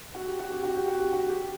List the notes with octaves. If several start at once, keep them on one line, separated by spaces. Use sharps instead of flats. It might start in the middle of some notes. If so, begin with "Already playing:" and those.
F#4
G4
F#4
G4
F#4
G4
F#4
G4
F#4
G4